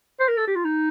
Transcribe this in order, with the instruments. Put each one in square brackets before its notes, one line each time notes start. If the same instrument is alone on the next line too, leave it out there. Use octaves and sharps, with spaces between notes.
[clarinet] C5
A#4
A4
G4
F4
D#4